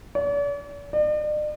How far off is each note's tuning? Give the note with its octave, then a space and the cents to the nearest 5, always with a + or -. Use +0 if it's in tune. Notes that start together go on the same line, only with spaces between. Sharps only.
D5 -45
D5 +45